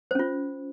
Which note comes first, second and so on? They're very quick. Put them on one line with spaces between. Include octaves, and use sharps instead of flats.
C5 C#4 F4